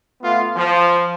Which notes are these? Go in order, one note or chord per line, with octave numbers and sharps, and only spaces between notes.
A3 B3 F4
F3